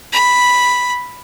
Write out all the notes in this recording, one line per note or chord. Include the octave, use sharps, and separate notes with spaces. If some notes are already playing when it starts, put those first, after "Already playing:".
B5